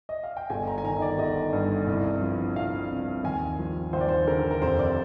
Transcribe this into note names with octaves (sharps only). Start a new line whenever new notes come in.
D#5
F5
G5
G1 G#5
A#5
G#5
D#3 A#5
D#5
D5
G1 D#5
G2
C2
F3
C2 F5
C3
D#2 G#5
F3
D#2 C5
D5
C5
D3 A#4
A#4
F1 C5
D5